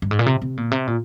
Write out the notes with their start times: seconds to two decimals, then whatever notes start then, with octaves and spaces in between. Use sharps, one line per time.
0.02 G2
0.11 G#2
0.19 A#2
0.26 C3
0.42 C3
0.57 A#2
0.71 C3
0.87 A#2